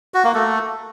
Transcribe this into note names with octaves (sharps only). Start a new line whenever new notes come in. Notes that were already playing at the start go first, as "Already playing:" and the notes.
F#4
A#3
A3